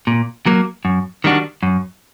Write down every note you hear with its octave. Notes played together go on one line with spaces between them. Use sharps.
A#2
F#3 A#3
F#2
D#3 G3 D4 F#4
F#2